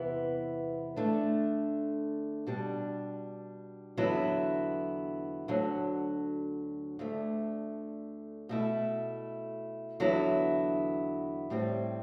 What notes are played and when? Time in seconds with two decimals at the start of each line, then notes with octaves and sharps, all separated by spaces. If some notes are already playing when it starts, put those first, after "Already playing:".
Already playing: E2 C3 E3 B3 E4
0.96 D3 A3 D4
2.47 B2 G3 D4
3.97 E2 D3 F#3 B3 E4
5.48 D2 D3 F#3
6.99 D2 D3 A3
8.49 B2 A3 E4
10.00 E2 D3 F#3 B3 E4
11.50 A2 G3 C4